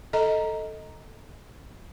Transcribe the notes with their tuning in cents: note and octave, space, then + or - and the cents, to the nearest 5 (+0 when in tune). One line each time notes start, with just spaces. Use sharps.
A4 +5 D#5 +10 A#5 +0